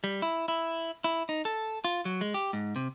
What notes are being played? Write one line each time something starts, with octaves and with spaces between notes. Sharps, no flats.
G3
E4
E4
E4
D#4
A4
F4
F#3
G#3
G4
G#2
C3